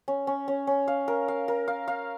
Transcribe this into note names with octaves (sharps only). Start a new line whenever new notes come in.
C#4
C#4
C#4
C#4
F5
A#4
F5
A#4
F5
F5